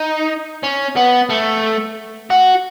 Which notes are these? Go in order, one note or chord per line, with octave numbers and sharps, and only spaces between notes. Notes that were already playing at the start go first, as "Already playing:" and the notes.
Already playing: D#4
C#4
B3
A3
F#4